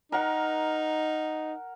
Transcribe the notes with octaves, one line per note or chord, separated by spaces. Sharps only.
D#4 A#4 F#5